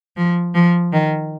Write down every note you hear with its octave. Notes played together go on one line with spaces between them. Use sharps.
F3
F3
D#3